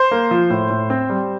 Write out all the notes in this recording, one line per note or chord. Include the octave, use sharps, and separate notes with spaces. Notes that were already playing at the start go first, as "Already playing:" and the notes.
Already playing: C5
A#3
F3
A2
A2
C4
G3